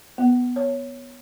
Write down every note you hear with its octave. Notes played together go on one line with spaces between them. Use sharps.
B3
C#5